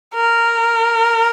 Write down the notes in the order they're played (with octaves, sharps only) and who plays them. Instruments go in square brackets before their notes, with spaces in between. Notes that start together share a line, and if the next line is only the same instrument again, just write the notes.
[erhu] A#4